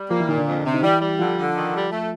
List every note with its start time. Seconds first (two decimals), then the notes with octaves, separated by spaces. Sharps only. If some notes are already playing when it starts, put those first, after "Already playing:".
Already playing: G3
0.10 F3 A#3 F4
0.20 E3 E4
0.28 A#2 D#3 D#4
0.38 D3 D4
0.47 F2
0.65 C3
0.74 D#4
0.83 E3 G3 E4
1.01 G3
1.19 D3 F3 F4
1.38 D3
1.55 D#3
1.74 G3
1.91 A3